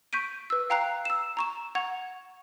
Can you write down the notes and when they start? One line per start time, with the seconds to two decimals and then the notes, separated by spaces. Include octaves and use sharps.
0.13 C#6 G6 B6 D7 D#7
0.50 B4 E6
0.70 F5 G5 A#5 F#6 C7
1.05 E6 E7
1.37 A#5 C#6 E7
1.75 F#5 C#6 G#6 F7